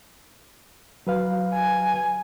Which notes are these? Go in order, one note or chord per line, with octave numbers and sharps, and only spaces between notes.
F#3 B4 F5
G#5